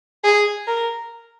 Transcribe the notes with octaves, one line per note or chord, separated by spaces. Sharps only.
G#4
A#4